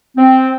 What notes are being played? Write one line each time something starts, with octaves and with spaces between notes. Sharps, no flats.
C4